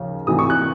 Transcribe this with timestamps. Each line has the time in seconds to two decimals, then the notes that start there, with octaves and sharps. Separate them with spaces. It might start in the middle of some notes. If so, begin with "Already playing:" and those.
Already playing: D#2 C#3 F3
0.27 D2 C3 E3 D#6
0.39 C#6
0.50 F#6